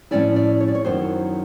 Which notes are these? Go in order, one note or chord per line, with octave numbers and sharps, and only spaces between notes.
A2 F3 G#3 C#4 E4 D5
D5
C#5
D5
C#5
F#2 D#3 F#3 B3 E4 C5